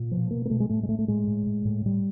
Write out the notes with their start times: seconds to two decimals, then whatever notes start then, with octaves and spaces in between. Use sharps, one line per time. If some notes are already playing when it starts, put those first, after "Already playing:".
Already playing: A#2
0.11 B2 F3
0.31 B2 A#3
0.45 A#3
0.50 B2 A3
0.60 G#3
0.69 A2 A3
0.83 G#3
0.88 A2 A3
0.99 A3
1.08 A2 G#3
1.27 A2
1.46 A2
1.65 A2
1.85 A2 G3